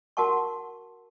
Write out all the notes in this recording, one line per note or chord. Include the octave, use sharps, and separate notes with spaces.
F#4 A#4 F#5 A5 C#6